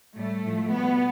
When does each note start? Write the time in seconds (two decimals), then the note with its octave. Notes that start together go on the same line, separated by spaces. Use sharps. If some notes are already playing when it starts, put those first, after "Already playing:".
0.16 A2 G3 A3
0.45 A2 F3
0.72 B2 G3 B3